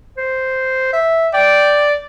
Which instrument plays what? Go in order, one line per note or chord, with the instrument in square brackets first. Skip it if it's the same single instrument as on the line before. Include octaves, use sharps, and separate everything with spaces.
[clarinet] C5
E5
[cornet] D5 [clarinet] G5